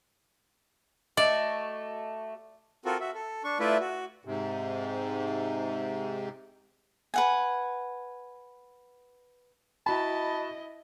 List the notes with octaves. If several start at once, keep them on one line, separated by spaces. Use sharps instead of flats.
A3 F#4 D5 D#5
C4 F4 F#4 A4 A#4
F#4 E5
A4
D4 C#6
A3 E4 F4 B4 D5 E5
F#4
G#2 C3
B4 F#5 G#5
E4 F#4 D#5 A5 B5